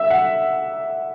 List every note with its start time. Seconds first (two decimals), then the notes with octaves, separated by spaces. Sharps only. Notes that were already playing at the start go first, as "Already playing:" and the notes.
Already playing: E5
0.10 F#5